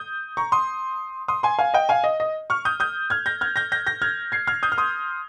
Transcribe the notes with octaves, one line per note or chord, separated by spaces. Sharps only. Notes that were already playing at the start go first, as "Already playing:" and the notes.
Already playing: D#6 G6
A#5 C#6
C6 D#6
C6 D#6
G#5 C6
F5 G#5
D#5 G5
F5 G#5
D#5
D#5
C#6 F6
D#6 G6
D#6 G6
F6 G#6
G6 A#6
F6 G#6
G6 A#6
G6 A#6
G6 A#6
F6 G#6
G#6 C7
F6 G#6
D#6 G6
F6
C6 D#6